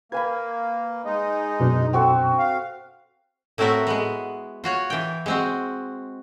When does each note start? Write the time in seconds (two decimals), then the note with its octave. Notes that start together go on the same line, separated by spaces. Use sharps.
0.12 A#3 B4 G#5 B5 G#6
1.05 G#3 D#4
1.60 F#2 B2 D4
1.93 C4 F#4 A4
2.39 F5
3.58 A2 A3 C4 F#4 A#4 E5
3.87 G#3 B3
4.64 F4 F#4 C#5
4.90 E3 G5
5.26 G#3 C4 F#4